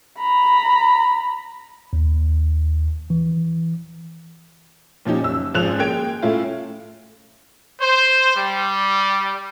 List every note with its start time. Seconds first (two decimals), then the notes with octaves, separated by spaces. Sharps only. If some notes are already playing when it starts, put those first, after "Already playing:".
0.18 A#5 B5
1.93 D#2
3.10 E3
5.05 A#2 F3 C#4 D#4 G4
5.24 F#1 E6
5.54 G#1 F3 G#3 C#4 F#6 F7
5.79 G#3 A#3 G5 G#6 D7
6.22 A2 A3 C#4 E4 F4
7.80 C5
8.36 G3